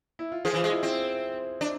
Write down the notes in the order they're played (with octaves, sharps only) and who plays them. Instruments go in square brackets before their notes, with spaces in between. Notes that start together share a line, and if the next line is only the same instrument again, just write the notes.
[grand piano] E4
F4
[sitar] F3 [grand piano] G#4
[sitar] E3
[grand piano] F4
[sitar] G#3
[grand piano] E4
[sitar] C4 [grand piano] E4
[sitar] D4